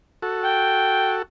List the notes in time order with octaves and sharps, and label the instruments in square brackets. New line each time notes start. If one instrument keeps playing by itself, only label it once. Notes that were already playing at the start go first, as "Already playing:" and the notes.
[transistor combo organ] F#4 A4
[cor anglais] G5